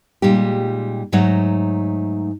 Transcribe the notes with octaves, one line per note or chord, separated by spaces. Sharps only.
A#2 G3 G#3 D#4 G4
G#2 F#3 A3 D#4 C#5 F#5